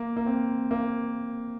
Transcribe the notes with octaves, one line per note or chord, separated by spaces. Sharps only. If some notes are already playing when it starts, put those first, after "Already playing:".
Already playing: A#3
A#3
C4
A#3